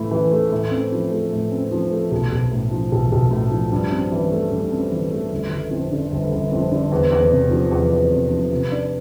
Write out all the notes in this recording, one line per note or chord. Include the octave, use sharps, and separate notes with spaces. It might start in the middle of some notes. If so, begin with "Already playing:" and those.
Already playing: A2 E3 A3 E4
E3
A3
A2
C4
F3
A3
A2
C4
F3
A3
B1
B1
A2
F3
B1
B1
A2
F3
G2
C4
E3
A3
G2
C4
E3
A3
G1
G1
F2
D3
G1
G1
F2
D3
E2
E2
C3
F3
E2
E2
C3
F3
C3
D4